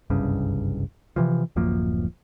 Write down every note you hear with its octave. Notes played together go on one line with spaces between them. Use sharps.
F#1 C2 G2 C#3
C3 E3 F3
D1 F#2 F3 A#3